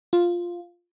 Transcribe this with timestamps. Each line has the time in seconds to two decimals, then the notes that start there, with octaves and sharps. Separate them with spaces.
0.13 F4